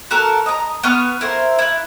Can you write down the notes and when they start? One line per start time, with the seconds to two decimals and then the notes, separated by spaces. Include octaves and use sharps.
0.11 F#4 A4 A#4
0.46 D#5 A#5
0.83 B3 C#6 F6
1.21 E4 A#4 C5
1.59 E4 F#6